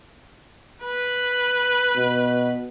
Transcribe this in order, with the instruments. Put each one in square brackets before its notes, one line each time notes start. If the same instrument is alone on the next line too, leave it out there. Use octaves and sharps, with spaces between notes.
[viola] B4
[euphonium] B2